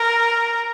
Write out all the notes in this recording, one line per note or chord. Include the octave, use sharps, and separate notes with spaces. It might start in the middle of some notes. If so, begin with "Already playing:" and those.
Already playing: A#4